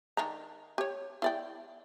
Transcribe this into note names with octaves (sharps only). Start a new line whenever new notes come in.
D#3 D4 A#5
G4 C#5
E4 D5 G5